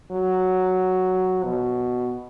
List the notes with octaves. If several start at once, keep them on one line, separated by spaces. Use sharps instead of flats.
F#3
B2